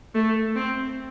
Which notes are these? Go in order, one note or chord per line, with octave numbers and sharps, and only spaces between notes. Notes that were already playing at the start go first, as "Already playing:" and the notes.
A3
C4